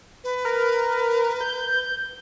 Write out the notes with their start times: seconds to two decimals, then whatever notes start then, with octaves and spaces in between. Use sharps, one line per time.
0.24 B4
0.45 A#4
1.41 G6